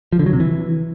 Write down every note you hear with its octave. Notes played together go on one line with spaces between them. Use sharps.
F3
D3
F#3
C3
E3